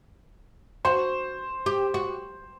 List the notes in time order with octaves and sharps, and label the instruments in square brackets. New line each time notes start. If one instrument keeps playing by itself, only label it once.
[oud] F#4 [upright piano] C5
[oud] G4
F#4